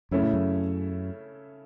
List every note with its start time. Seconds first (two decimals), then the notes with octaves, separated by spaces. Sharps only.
0.11 F#2 C#3 A3 C#4 E4
0.22 A2
0.33 F#2